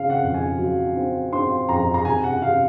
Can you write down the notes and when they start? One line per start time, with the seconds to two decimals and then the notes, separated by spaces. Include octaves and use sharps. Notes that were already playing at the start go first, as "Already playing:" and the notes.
Already playing: C#3 C4 F5
0.10 F#5
0.23 F2
0.34 G#5
0.58 F#3
0.96 C4
1.32 C4 C6
1.69 F2 A#5
1.94 A#5
2.05 C3 G#5
2.24 F#5
2.42 C3 F5